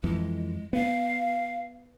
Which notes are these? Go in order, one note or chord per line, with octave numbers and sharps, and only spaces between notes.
F2 E3 G#3
B3 F5